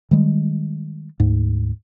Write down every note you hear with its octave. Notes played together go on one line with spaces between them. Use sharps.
D#3 G3 G#3
D2 G#2